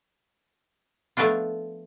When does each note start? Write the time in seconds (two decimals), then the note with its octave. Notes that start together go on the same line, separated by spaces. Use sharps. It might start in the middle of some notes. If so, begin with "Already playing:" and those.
1.17 F3 A3 B3 D4 F4